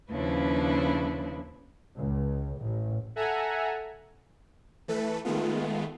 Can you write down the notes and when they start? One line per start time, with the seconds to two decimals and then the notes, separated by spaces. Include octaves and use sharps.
0.10 D#2 C#3 F3 D4 E4 B4
1.97 C#2
2.60 A1
3.16 A4 E5 F#5 G#5 A#5
4.88 E3 A3 A4 B4
5.25 D#3 G#3 A3 B3 F4